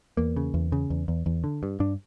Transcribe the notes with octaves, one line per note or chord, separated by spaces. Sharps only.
E2 A#3
C#3
E2
C#3
E2
E2
E2
D3
G2
G2 D4